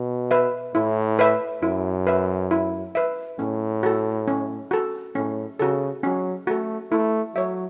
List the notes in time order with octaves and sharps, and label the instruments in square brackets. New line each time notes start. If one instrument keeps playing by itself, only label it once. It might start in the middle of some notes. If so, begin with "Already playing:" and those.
Already playing: [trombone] B2
[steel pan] B4 E5
[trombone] A2 [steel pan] E4
[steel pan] B4 E5
[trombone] F#2 [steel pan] E4
[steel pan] B4 E5
E4
B4 E5
[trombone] A2 [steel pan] C#4
[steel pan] F#4 A4
C#4
F#4 A4
[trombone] A2 [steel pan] C#4
[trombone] C#3 [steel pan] F#4 A4
[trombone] F#3 [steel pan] C#4
[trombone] A3 [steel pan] F#4 A4
[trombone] A3 [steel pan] E4
[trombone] F#3 [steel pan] C#5 E5